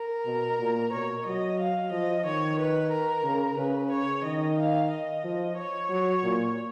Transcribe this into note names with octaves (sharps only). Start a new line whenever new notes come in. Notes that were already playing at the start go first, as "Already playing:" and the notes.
Already playing: A#4
B2
A#2
B2 C#5
F#3 D#5
F5
F3 D#5
D#3 C#5
B4
A#4
C#3
C#3 B4
C#5
D#3 D#5
F5
D#5
F3
C#5
F#3
A#2